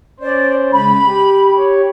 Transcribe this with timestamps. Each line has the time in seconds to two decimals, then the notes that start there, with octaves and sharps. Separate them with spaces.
0.20 C#4 C5 D5
0.72 C#3 G#3 B5
1.07 G4
1.56 G4 C#5